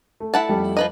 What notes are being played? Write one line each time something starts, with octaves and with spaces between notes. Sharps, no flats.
A3
E4 F#5 A5
F2 G3 A3
F3 B4 D#5